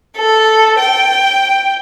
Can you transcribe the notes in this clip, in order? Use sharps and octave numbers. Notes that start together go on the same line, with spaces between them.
A4
G5